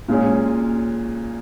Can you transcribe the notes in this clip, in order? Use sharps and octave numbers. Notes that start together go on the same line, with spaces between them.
A#2 G#3 C#4